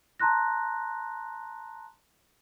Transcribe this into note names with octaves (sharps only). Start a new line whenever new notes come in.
A5 A#5 C6 F#6 A#6